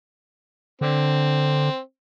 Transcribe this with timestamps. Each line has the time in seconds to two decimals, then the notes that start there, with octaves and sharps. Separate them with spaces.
0.81 D3 C4